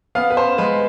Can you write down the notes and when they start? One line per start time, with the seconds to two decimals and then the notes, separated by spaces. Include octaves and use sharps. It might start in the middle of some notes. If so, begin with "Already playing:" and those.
0.15 B3 F5
0.30 B4
0.37 C5
0.58 G#3 B4